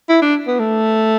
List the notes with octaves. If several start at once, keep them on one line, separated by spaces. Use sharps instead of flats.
E4
D4
B3
A3